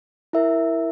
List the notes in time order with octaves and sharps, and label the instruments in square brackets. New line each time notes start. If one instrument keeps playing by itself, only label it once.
[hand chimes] E4 A#4 E5